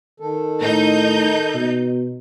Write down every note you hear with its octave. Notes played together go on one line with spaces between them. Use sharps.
D#3 A4
A2 D#4 G6
B2